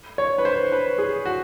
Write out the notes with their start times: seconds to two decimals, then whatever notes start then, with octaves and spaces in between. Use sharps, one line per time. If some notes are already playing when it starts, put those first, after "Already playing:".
0.18 C#5
0.38 B4
0.45 C5
0.72 B4
0.98 G#4
1.25 F#4